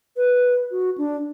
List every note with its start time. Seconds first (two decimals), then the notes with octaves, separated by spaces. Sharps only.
0.17 B4
0.71 F#4
0.98 D4